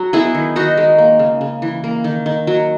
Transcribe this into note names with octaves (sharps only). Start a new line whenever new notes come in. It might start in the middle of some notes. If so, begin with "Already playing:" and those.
Already playing: F#3
B3 E4 G#4
D#3
D#3 D#4 F#4
G#3
A#3
C#3
C#3
E3
A#3
D#3
D#3
F#3